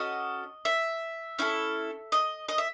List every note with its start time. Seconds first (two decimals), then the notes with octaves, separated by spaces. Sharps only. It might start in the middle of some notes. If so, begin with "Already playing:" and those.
Already playing: C#4 F#4 A4 D#5
0.65 E5
1.39 C#4 E4 A4
2.12 D#5
2.48 D#5
2.58 E5